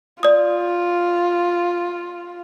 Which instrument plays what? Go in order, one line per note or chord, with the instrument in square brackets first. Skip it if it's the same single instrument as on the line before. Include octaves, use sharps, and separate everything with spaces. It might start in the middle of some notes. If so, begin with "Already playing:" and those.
[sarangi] F4 [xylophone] D5 D#6